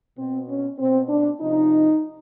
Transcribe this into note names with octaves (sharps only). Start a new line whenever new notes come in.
B2 C4
C#4
B2 C4
D4
C3 F3 D#4